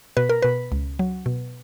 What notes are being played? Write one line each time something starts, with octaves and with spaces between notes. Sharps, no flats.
B2 B4
A#4
B2 B4
C#2
F#3
B2